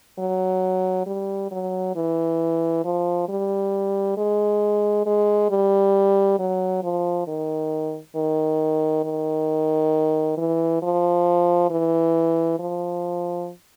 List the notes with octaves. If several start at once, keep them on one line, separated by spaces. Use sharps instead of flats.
F#3
G3
F#3
E3
F3
G3
G#3
G#3
G3
F#3
F3
D#3
D#3
D#3
E3
F3
E3
F3